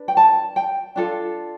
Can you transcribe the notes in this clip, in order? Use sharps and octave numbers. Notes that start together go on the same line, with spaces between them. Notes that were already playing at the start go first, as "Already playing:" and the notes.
Already playing: D4 B4
G5
A5
G5
D4 F4 A4